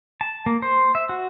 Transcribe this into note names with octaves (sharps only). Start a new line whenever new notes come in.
A5
A#3
C5
E5
F#4